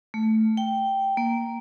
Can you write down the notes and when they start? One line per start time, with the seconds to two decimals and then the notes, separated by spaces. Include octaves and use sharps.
0.14 A3
0.57 G5
1.17 A#3